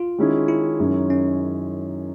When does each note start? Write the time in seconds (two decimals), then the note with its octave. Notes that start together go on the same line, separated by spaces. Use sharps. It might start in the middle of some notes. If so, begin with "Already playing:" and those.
Already playing: F4
0.18 D#3 G#3 C#4 E4 G#4
0.48 E4
0.79 F#2 D#3 G#3 C#4
1.10 C#4